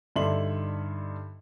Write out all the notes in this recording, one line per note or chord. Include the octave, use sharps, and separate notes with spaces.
G2 D3 D#4 E5 C6 F#7